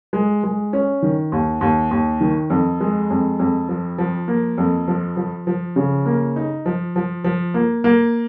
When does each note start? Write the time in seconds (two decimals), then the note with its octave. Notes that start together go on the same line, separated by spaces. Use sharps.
0.13 G#3
0.44 G#3
0.73 C#4
1.02 D#3
1.32 D#2
1.61 D#2
1.91 D#2
2.21 D#3
2.50 F2
2.80 G#3
3.10 F2
3.39 F2
3.69 F3
3.98 F3
4.28 A#3
4.58 F2
4.88 F3
5.17 F3
5.47 F3
5.76 C#3
6.06 A#3
6.36 D#4
6.66 F3
6.96 F3
7.24 F3
7.54 A#3
7.84 A#3